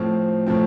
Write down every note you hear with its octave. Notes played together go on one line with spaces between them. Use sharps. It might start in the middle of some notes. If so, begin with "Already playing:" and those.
Already playing: A2 F3 C4
A2 F3 C4